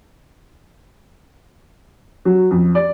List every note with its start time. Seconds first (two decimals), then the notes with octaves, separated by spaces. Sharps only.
2.25 F#3
2.51 F2
2.75 D5